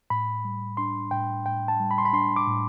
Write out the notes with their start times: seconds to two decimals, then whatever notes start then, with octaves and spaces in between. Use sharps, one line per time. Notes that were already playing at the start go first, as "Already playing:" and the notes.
0.10 A2 B5
0.45 G3
0.77 D4 C6
1.11 A2 G5
1.45 A2 G5
1.68 A5
1.80 G3
1.91 B5
1.98 C6
2.05 B5
2.13 D4 C6
2.36 D6
2.47 A2